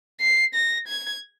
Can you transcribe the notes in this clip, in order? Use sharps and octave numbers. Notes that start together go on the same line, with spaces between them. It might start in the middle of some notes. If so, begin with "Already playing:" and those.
C7
A#6
G#6